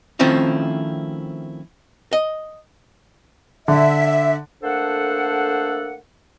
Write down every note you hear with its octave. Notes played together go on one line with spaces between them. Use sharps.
D#3 F3 A3 C4 C#4 E4
D#5
D3 E5
A3 A#3 D4 A4 C5 F#5